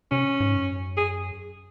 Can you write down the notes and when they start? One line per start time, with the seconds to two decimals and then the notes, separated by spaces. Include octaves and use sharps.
0.11 C3 C#4
0.40 G#2
0.54 F#2
0.97 G#4